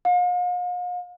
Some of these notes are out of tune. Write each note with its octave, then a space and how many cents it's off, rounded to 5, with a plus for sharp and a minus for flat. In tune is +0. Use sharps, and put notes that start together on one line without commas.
F5 +40